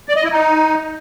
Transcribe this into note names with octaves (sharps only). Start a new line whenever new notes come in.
D5
D#5
E4
D#4